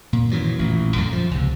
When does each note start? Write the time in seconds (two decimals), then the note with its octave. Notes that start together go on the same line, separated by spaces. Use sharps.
0.13 A#2
0.31 F#2 D#3 E3 F#3
0.59 A1 A#2
0.96 B1 F#2 D3
1.13 F3
1.31 C#2 C3